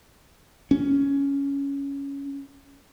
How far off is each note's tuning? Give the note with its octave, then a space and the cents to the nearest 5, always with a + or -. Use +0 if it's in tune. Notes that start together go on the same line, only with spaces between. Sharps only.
C#4 +10